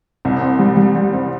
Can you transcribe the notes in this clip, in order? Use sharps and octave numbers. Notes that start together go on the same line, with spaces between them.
C2
C4
G3
G3
G3
C4